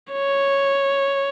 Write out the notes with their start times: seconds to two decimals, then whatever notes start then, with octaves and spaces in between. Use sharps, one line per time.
0.13 C#5